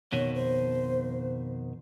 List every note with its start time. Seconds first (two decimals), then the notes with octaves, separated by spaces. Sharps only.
0.12 F2 B2 D#3 C#5
0.35 C5